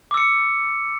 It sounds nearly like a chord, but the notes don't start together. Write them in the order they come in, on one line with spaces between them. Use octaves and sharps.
D6 E6 C#7